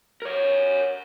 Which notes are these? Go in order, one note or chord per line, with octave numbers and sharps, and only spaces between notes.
A#4 C#5